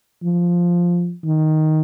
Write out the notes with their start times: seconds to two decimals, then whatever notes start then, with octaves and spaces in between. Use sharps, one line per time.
0.23 F3
1.25 D#3